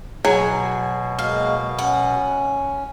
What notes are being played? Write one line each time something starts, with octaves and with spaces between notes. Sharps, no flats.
B2 F#3 G#4 G#5
G#3 A#3 F#4 F5
C#4 F#5